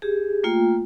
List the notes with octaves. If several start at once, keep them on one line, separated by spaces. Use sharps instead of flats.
G4 G#4
A3 A#3 F4 G5